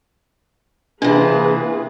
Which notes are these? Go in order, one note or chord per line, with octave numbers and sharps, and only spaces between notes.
C3 E3 A#3 D4 G#4 B4